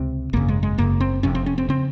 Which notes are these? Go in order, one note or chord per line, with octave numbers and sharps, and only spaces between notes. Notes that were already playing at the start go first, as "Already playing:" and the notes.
Already playing: C#2 C3 C4
G#1 F#2 C#3 A#3
G#3
G#3
F#1 F#2 C#3 A#3
C4
F1 F2 C3 C#4
C4
C#4
C4
C#3 C4